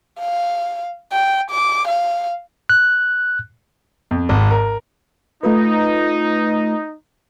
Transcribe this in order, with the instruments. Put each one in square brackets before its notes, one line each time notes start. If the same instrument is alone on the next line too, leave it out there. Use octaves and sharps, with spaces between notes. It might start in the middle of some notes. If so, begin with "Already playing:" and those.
[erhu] F5
G5
D6
F5
[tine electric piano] F#6
[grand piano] F2
G#1
A#4
[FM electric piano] A3 F4 B4 [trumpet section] D#4